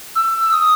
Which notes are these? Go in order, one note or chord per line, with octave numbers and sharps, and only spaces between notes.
E6
D#6